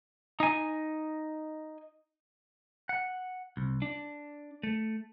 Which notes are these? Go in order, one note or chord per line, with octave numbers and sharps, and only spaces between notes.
D#4 G#5
F#5
C2
D4
A3